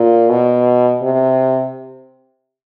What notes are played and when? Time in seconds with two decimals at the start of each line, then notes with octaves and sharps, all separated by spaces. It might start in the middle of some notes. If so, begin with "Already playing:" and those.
Already playing: A#2
0.29 B2
1.03 C3